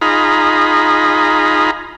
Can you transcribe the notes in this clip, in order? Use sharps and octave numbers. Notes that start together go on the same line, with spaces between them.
D#4 F4 G#4 A#5 B5